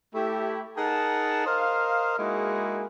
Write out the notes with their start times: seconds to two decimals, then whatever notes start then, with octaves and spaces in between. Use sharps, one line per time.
0.15 A3 E4 G4
0.77 D#4 G#4 A#4 F#5 A5
1.46 A#4 C5 D#5 F5
2.18 G#3 A#3 D#4 E4 F#4 G#4